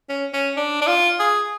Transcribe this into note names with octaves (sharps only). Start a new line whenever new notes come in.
C#4
C#4
D4
D4
F4
G#4